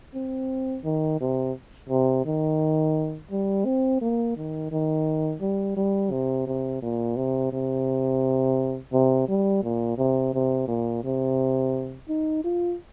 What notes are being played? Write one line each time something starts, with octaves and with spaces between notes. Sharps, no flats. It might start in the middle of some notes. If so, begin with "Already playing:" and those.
C4
D#3
C3
C3
D#3
G3
C4
A#3
D#3
D#3
G3
G3
C3
C3
A#2
C3
C3
C3
G3
A#2
C3
C3
A#2
C3
D#4
F4